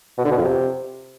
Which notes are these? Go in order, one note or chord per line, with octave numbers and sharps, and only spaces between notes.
B2
D3
B2
F2
C3